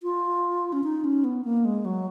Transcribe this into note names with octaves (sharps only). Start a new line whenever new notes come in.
F4
C#4
D#4
C#4
B3
A#3
G#3
F#3